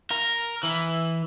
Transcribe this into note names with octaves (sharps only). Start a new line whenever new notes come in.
A#4
E3